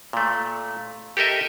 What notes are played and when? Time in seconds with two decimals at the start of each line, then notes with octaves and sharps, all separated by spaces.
0.13 A#2 A3
1.17 G4 A4 A#4 D#5 E5